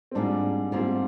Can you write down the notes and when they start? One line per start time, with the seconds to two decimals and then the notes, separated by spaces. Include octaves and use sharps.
0.11 C4
0.15 G#2 G3 A#3 D4 F4
0.72 G#2 G3 A#3 C4 F4